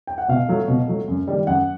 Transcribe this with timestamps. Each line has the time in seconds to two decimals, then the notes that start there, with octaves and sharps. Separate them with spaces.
0.07 G5
0.18 F#5
0.28 B2 F5
0.48 F#3 A3
0.68 B2
0.88 F#3 A3
1.08 F#2
1.27 D#3 G3 A#3
1.47 F#2 F#5